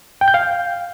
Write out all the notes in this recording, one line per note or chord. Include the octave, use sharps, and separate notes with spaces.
G5
G6
F5